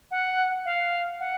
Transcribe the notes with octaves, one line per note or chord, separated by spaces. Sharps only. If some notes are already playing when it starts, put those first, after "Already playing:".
F#5
F5
F#5